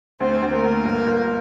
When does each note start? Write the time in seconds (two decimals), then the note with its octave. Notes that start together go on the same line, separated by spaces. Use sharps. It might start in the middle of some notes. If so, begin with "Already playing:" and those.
0.20 D2 C4 C5
0.42 D2
0.52 A#3 A#4
0.64 D2
0.85 G1
1.07 G1